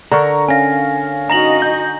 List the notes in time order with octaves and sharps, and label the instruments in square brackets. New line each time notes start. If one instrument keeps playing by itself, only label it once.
[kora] D3 A#4 [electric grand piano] A#5 C#6
[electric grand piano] C#4 F5 [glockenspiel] G#5 A#6
[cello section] D#4 F#4 D#5 [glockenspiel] A#5 A#6 F#7
[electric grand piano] G6